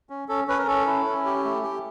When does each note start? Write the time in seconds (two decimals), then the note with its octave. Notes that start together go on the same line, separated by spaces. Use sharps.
0.10 C#4
0.29 C#4 A4
0.48 C#4 B4
0.58 A#4
0.67 C#4 A4
0.87 E4
1.06 C#4
1.25 G4
1.45 A3
1.63 G4